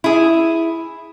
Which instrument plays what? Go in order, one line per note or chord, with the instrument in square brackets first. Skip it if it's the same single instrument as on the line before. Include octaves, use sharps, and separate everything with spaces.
[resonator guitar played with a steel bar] E4 G#4